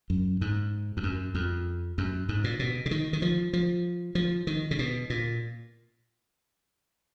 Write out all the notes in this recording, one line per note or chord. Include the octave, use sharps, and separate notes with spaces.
F#2
G#2
F2
F#2
F2
F#2
G#2
A#2
B2
C#3
D#3
D#3
F3
F3
F3
D#3
C#3
B2
A#2